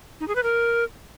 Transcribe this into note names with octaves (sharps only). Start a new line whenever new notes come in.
D#4
G#4
B4
A#4